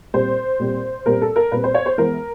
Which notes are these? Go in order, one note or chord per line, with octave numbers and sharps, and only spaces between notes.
A#2 G3 C4 C5
A#2 G3 C4
A#2 G3 C4 A#4
A4
A#4
A#2 G3 C4 B4
C5
C#5
C5
E3 G#3 B3 A#4